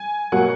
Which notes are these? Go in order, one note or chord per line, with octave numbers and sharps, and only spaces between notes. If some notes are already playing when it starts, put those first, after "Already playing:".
Already playing: G#5
B2 F#3 A#3 F#5